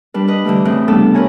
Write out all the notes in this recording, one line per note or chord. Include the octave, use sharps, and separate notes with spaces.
G3 D4 B4
D4 B4 D#5
D3 E3 G3 A3
A2 C#3 E3 C4 F#6
C3 G3 A3 B3 D4 A4
A#4 B4 C#5 G#5 A#5